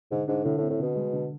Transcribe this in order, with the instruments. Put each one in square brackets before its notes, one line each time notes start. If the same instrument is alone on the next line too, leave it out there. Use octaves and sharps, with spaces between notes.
[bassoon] G#2 [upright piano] D3
[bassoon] G#2 [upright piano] D4
[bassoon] A2 [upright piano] D3
[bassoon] A2
[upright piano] C4
[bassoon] A2
[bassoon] B2 [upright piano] D3
[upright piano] G#3
D3